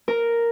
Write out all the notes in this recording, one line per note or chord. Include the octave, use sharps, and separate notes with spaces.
A#4